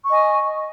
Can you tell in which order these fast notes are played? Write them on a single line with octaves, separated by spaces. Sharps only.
C#6 D#5 G#5